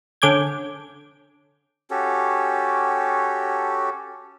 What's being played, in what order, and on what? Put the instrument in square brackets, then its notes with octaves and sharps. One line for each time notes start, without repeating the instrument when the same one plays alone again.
[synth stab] D3 C#4 D6 G6 G#6
[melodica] C#4 F#4 G4 A4